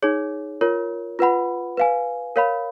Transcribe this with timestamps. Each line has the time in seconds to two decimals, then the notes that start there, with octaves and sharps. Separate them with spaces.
0.03 D#4 G#4 C#5
0.61 F4 A#4 C#5
1.19 F4 B4 F#5 B5
1.77 B4 F5 G#5
2.36 A#4 C#5 F5 B5